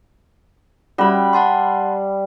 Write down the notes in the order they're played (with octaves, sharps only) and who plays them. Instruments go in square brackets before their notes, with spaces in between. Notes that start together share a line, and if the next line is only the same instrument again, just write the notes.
[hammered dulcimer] G3 B5 [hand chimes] C#4 F#4 F#5
[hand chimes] F#5 A5 C6